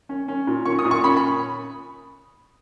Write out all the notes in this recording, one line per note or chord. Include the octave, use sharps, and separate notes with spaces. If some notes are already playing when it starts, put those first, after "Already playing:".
C#4
C#4
A#2
C#4 C#6
D#6
A#2
C#6
C#4 B5
B5